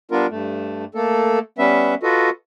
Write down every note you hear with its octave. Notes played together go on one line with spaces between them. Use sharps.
G3 B3 D4 F4 A#4
G2 A3
A3 A#3 A4
G3 B3 C#4 B4 E5
F4 F#4 A4 B4 D#5